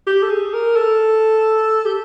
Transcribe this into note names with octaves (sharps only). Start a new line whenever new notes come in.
G4
A4
G#4
A#4
A4
G4